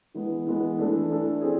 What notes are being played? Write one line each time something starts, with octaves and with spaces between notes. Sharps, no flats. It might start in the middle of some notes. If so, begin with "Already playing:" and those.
E3 G#3 B3
E3 G#3 B3
E3 A3 D4 A4
E3 A3 D4 A4
C4 E4 G#4